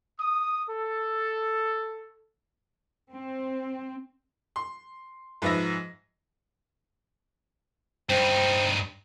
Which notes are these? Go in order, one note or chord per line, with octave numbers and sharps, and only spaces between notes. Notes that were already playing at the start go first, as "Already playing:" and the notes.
D#6
A4
C4
C6
G#2 F3 B4 E5 A#6
G2 C4 D#4